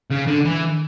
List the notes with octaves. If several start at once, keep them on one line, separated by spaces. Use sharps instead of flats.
C#3
D3
E3